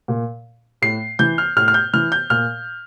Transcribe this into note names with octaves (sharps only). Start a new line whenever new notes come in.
A#2
A2 C7
E3 G6
F6
A2 F6
F6
G6
E3 F6
G6
A#2 F6